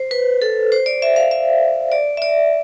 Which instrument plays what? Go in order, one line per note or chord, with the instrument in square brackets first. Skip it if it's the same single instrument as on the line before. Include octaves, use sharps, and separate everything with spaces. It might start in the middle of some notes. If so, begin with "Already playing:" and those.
Already playing: [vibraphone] C5
B4
A4
C5
D5
E5
F5
E5
D5
E5
D5